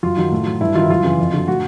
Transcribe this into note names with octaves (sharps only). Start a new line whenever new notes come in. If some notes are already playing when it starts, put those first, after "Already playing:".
F#2 F4
D#3 F#3
A2
F#3
G2 E4
D#3 F#3 F4
E4
F#2 F4
C#3 E3
F2
D3 F#3
A2 F#4